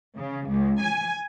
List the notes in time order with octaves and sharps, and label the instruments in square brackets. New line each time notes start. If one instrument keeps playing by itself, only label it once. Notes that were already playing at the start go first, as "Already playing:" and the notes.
[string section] C#3
C#2
G#5